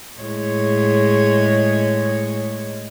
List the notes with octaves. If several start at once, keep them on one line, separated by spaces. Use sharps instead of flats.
A2 G#3 C#5